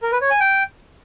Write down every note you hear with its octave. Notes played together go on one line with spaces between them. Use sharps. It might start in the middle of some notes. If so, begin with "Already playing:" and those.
A#4
B4
C#5
G#5
G5